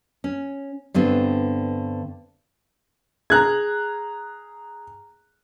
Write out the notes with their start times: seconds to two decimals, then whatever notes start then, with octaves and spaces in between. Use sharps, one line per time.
0.24 C#4
0.94 G2 D3 B3 C4
3.30 G#4 A#5 F#6 G#6